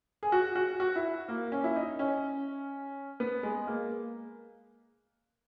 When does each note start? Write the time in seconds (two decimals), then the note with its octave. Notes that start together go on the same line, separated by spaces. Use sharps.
0.23 G#4
0.32 F#4
0.55 F#4
0.80 F#4
0.96 E4
1.28 A#3
1.52 C#4
1.64 E4
1.76 D#4
1.99 C#4
3.20 B3
3.43 G#3
3.67 A#3